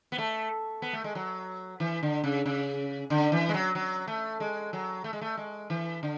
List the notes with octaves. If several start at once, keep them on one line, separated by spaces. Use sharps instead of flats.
B3
A3
B3
A3
G#3
F#3
E3
D3
C#3
C#3
D3
E3
G#3
F#3
F#3
A3
G#3
F#3
A3
G#3
A3
G#3
E3
D3